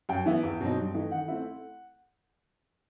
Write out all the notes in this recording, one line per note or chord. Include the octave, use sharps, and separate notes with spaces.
F#2 G5
E3 B3 E4
E2
B2 F#3 C4 D#4
G2
E3 A3 D#4
D#3 F#5
A3 C4 E4